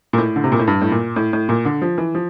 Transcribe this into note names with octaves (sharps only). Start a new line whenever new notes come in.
A#2
A2
D3
C3
A#2
A2
G2
A2
A#2
A2
A2
A#2
D3
F3
E3
F3